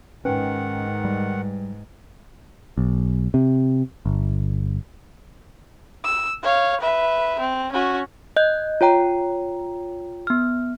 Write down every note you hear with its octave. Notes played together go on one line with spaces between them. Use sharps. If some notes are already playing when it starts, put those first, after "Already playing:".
G#2 D#3 C#4 B4 F#5 G5
G3
B1
C3
G1
E6
C#5 F5
B4 E5
C4
C#4 F#4
D#5 F#6 G6
F4 C#5 G5 A#5
B3 F6